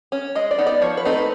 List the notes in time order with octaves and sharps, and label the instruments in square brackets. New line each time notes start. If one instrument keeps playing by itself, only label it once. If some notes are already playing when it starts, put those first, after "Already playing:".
[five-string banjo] C#4
G#3 D#5
D5
B3 D#4
D5
F3 C#5
B4
A3 C4 D#4
B4